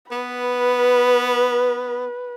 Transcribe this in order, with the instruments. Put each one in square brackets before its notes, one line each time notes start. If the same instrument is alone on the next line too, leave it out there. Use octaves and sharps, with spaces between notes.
[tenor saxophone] B3 [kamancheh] B4